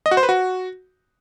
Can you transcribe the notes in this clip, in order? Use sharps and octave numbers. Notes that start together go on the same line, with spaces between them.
D#5
F#4
C5
B4
F#4